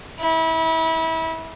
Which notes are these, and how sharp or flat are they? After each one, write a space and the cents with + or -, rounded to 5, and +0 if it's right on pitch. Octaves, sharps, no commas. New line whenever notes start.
E4 -30